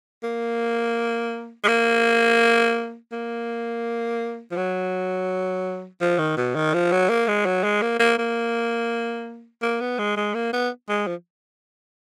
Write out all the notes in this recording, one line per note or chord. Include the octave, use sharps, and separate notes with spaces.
A#3
G#3
A#3
A#3
F3
F#3
F3
D#3
B2
D#3
F3
F#3
A#3
G#3
F#3
G#3
A#3
A#3
A#3
A#3
B3
G#3
G#3
A#3
B3
G#3
F3